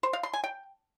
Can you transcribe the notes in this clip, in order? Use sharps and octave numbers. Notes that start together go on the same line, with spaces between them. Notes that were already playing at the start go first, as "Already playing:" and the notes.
C5
F5
C6
G#5
G5